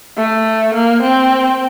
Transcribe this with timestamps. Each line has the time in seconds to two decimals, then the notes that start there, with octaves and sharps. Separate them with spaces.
0.17 A3
0.74 A#3
1.02 C4